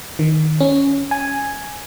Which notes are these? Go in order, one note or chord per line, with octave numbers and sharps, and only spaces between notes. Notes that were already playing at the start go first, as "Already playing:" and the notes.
D#3
C#4
G#5